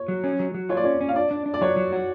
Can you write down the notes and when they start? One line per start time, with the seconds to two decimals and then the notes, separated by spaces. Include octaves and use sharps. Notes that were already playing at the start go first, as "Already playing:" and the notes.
Already playing: C#5
0.08 F#3
0.24 C#4
0.39 F#3
0.55 F#3
0.69 F4 C#5
0.77 D5
0.84 C#4 C#5
1.01 C#4
1.09 F5
1.16 D4 D5
1.31 D4
1.46 D4
1.54 D5
1.61 F#3 C#5
1.76 F#3
1.93 F#4